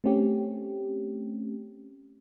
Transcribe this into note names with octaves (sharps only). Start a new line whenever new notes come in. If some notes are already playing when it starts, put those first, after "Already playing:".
A3 C4 C#4 G4